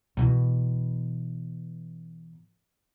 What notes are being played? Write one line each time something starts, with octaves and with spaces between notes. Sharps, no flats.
B2 E3